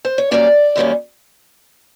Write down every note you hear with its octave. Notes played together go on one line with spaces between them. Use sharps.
C5
C#5
F#2 D#3 G3 A#3 C#4 D5
F#2 D#3 G3 A#3 C#4